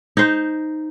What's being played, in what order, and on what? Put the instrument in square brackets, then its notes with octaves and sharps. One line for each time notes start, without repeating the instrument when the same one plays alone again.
[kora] D#4 C5